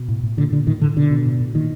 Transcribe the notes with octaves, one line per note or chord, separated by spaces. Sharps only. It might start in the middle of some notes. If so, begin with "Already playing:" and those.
Already playing: B2
A2
A2
A#2 D3
A#2 D3
A2 D#3
A2 D3
B2 D3
B2
A2
A2
A#2 D#3